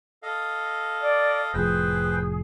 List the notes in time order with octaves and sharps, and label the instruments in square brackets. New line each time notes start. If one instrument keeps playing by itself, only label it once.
[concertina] A4 D#5 F5
[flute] D5
[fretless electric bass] F1 A2 F3 [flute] G#4 [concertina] B4 C5 G5